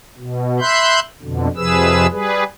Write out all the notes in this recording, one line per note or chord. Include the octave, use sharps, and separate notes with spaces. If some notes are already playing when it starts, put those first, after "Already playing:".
B2
E5 B5 C6 F#6 G6
F2 B2 D3
F2 C3 F3 G#4 B4 E6
G3 G#4 B4